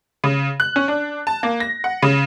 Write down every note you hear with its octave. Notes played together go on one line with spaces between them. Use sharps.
C#3
F#6
C#4
D4
A5
A#3
A#6
F#5
C#3